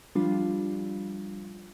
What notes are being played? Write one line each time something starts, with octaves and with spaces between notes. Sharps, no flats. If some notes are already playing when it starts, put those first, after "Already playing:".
F3 G3 D4 F4